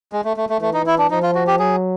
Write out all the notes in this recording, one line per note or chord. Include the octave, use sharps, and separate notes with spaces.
G#3
A3
A3
A3
E3 A3
D#4
E4
D4
F3 D#4
F4
F#4
G4
F#3 G#4